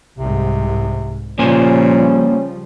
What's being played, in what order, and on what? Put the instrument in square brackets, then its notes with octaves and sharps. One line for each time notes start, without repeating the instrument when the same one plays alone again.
[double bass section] C2 G#2 [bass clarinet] C3
[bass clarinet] A#2 [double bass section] C#3 F3 G3 [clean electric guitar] A#3 C5 G#5 [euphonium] C#4